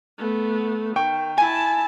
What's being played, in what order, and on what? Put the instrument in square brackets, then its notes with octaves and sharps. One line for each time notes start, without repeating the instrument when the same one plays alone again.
[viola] A3 B3
[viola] D#3 [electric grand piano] G5 [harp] C#6
[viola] E4 A5 [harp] G#5